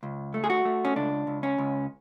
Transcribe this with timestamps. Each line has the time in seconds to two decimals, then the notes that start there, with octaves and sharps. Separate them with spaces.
0.03 C#2
0.34 A3
0.44 G#4
0.50 F#4
0.65 A3
0.85 C#4
0.96 C#2 D4
1.27 C#2
1.43 C#4
1.58 C#2